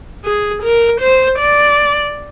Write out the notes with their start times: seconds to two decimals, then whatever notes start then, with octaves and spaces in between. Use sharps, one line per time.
0.25 G#4
0.63 A#4
1.01 C5
1.39 D5